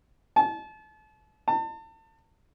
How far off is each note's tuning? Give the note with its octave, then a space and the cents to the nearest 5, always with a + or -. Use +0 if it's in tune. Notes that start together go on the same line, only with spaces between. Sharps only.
A5 -35
A5 +35